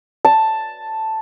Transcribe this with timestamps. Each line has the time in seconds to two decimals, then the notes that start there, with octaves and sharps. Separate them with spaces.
0.25 A5